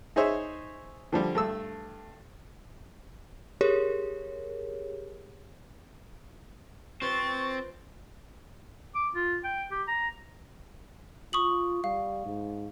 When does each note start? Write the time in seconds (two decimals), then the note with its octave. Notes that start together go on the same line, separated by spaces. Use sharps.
0.16 D#4 G#4 C5 C#5 E5
1.12 D3 F3 G3
1.35 G2 A3 E6
3.61 G4 G#4 A#4 C#5
7.02 C4 F4 B4 C5 C#6 A6
8.95 D6
9.15 F4
9.44 G5
9.71 G4
9.88 A#5
11.33 F4 C#6 D#6 F#7
11.84 G3 F5
12.26 G#2